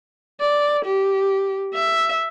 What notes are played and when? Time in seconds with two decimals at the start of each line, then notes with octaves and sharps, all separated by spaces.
0.40 D5
0.85 G4
1.74 E5